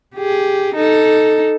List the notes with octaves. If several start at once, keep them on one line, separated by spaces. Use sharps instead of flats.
G4 G#4
D#4 A4